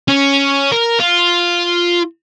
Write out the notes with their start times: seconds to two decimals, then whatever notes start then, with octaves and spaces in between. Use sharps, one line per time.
0.08 C#4
0.72 A#4
1.00 F4